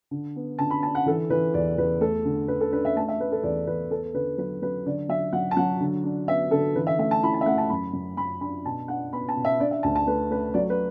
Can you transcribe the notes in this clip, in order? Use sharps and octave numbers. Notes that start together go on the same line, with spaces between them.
D3
B3
D3 A5
B5
D4 A5
F#5
E3 A4
E3 B4
E2 D5
E2 B4
A3 A4
D3
D3 B4
A4
D4 B4
E5
A3 A5
E5
A3 B4
A4
E2 D5
E2 B4
B3 A4
D3 B4
F#3 B4
F#3 B4
D3 D5
F#3 E5
F#3 F#5
A5
F#3 F#5
D3
D4
B3 E5
D3 A4
E3 B4
E5
A3 E5
A5
E4 B5
A5
E5
A3 F#5
A5
F#2 B5
F#2
F#2 B5
D4 B5
B2 A5
D4 F#5
B3 B5
A5
B2
E5
D4 D5
E5
D2 A5
A5
A3 B4
A3 B4
F#3 D5
B4